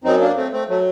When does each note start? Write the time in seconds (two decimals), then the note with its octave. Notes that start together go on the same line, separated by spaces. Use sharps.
0.04 F#2 F#3 C4 D#4
0.20 A#3 D4
0.36 A3 C4
0.53 A3 C4
0.69 F#3 A3